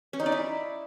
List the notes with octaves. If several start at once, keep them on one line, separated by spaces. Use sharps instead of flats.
C#4
D#4
D5
E4